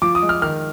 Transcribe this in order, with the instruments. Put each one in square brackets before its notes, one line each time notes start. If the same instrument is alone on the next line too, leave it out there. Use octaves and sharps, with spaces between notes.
[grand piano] F3 D6
D#6
G#3
F6
D#3 F6